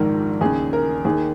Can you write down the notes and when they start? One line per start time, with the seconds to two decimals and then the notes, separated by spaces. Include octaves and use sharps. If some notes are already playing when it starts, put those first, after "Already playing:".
Already playing: A#1 G#2 D#3 A#4
0.41 D#2 C#3 G#4
0.73 A#4
1.05 D#2 D#3 G#4